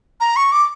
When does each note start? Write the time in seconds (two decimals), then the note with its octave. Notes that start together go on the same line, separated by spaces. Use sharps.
0.21 A#5
0.36 C#6
0.52 D6